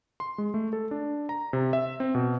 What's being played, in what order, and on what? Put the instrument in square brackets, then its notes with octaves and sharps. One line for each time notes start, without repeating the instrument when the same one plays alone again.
[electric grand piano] C6
G#3
A3
A4
D4
A#5
C3
E5
C4
B2